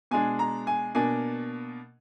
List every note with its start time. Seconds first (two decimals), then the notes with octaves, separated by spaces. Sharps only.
0.11 B2 G#3 D4 G#5
0.39 A#5
0.67 G#5
0.95 B2 A#3 D4 G#5